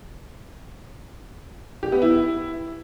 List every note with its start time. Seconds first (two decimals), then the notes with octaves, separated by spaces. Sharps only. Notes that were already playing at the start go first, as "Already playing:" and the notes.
1.83 G4
1.92 B3
2.02 E4